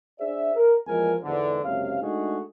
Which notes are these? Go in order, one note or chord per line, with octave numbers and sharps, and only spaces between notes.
D4 G#4 C5 D5 E5
A#4
E2 A#2 F3 G#3 A#4 G#5
E2 G#2 D3
F#1 C3 G#3 C#4 F5
G#3 A3 D4 D#4 F#4 G#4